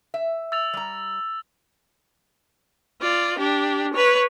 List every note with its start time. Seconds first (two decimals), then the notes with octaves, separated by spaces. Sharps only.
0.14 E5
0.52 E6 A6 F7
0.73 G3 A#5
3.01 F4 D5
3.38 D4 G4
3.93 B4 C#5